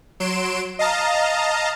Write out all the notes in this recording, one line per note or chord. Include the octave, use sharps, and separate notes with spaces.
F#3 C6 D7 E7
D#5 F5 A5 A#5